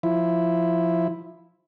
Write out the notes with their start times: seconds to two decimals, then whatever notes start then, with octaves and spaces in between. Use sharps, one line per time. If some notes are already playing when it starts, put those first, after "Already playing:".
0.03 F3 E4